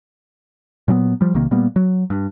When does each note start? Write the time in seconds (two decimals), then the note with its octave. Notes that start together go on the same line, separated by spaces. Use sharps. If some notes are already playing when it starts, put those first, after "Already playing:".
0.88 A#2 F#3 A#3 B3
1.21 F3 G3
1.34 B1 C3 D#3 A#3
1.51 A#2 G3 A#3 B3
1.76 F#3
2.10 G2